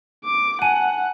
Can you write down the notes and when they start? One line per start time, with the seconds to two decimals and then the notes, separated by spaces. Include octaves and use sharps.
0.25 D6
0.62 F#5 G#5 A5 D#7